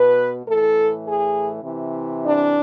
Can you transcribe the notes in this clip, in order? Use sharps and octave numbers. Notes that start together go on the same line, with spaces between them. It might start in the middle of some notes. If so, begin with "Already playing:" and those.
Already playing: B2 B4
A2 E3 A4
G#4
C3 E3
D4